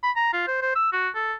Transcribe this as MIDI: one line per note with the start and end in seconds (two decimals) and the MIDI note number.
0.03 0.11 83
0.16 0.32 82
0.33 0.43 65
0.47 0.61 72
0.62 0.73 72
0.76 0.91 88
0.93 1.09 66
1.15 1.34 69